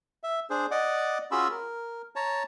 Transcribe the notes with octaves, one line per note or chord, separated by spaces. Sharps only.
E5
D4 G#4 C5
D5 D#5 F#5 D6
C#4 F4 F#4 G#4 B5 E6
A#4
C#5 A5 A#5